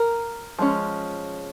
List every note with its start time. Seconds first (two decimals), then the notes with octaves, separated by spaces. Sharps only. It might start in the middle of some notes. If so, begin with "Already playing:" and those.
Already playing: A#4
0.59 F3 G#3 C#4